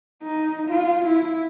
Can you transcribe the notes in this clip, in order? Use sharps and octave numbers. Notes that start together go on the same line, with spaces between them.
D#4
F4
E4